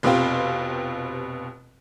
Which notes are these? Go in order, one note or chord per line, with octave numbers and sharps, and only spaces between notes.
F1 B2 C4 F4 G4